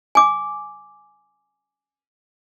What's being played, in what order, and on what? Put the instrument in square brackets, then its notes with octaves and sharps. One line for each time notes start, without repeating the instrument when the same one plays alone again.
[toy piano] G#5 D6